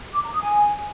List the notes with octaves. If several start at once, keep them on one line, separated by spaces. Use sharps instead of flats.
D6
A#5
D#6
G#5